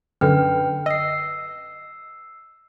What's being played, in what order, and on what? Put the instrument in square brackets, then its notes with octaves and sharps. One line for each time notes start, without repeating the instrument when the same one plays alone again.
[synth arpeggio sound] F#2 D3 [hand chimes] B4 G5 F6
[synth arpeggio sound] D#5 [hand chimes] E6 C7